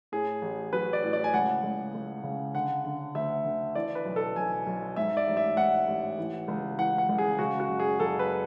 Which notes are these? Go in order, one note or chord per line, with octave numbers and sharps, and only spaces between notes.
A2 G#4
A1
F#3 B4
D5
A2
D5
G#5
C#2 F#5
C#2
C#2
C#3
D3 F#5
D3
D2 E5
D3
E3 D5
B4
B1
A4
B1 G#5
B1
G#2 E5
D5
A1
E5
G#2 F#5
A1
E3
C#2
E3 F#5
F#5
C#2
G#4
C#3 F#4
F#4
F#1
G#4
F#1 A4
B4